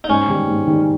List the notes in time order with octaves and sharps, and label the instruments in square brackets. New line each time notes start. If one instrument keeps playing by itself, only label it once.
[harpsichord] D#4
[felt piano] G#2 [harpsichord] C#4
[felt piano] D#3 G3
G#2
D#3 G3